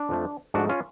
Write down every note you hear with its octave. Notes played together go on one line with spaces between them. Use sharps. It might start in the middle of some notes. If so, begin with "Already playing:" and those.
Already playing: D4
F2 F3 A3
G#2 F3 A3 D4 F#4
C#4 F4